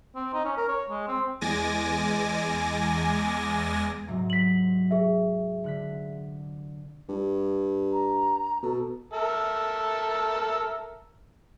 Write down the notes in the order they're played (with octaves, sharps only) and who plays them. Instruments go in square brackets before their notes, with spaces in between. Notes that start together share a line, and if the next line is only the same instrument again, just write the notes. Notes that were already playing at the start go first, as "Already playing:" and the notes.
[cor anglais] C4
D#4
C#4
A#4
C#5
G#3
C4
[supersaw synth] E2 G#3 G#5 D6 A6 A#6
[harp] G#2 C3 F#3
[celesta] B6 F#7
G#4 E5
[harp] D3 F#6 B6
[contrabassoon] G2
[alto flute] A#5
[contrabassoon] B2 [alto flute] A4
[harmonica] A4 A#4 E5